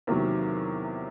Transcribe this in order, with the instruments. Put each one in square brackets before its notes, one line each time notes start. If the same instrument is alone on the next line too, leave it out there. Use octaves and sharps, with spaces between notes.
[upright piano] E2 C3 D#3 F#3 A#3